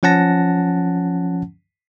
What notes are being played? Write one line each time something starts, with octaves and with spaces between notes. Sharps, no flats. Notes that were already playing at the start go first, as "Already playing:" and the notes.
F3 C#4 F#5 A5 A#6